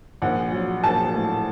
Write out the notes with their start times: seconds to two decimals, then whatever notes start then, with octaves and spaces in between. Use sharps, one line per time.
0.22 A#1 F#5
0.52 F#3
0.84 A#1 A5
1.15 A2